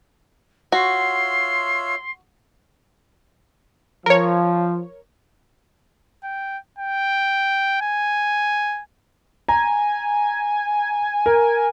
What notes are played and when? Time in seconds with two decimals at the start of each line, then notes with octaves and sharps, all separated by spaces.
0.72 F4 F#4 C#5 E5 C6
4.06 F3 A#4 C#5
6.24 G5
6.78 G5
7.81 G#5
9.48 G#5 A#5
11.26 A#4